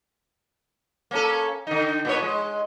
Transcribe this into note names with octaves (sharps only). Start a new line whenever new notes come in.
A#3 C#4 A4
D3 D#4
A#2 B3 C#5
G#3